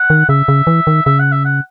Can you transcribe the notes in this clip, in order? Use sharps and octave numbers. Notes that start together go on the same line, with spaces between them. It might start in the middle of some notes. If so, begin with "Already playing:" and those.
Already playing: F#5
D#3
C#3 E5
C#3
E3
D#3
C#3 E5
F#5
E5
F#5